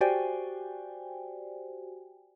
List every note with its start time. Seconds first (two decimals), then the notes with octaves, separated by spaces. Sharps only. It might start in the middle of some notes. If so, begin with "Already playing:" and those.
0.01 F#4 G4 C5 D5 G5 G#5